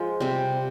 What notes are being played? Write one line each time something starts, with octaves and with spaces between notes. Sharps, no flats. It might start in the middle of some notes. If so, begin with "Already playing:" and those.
Already playing: F3 G#3
C3 G3 C4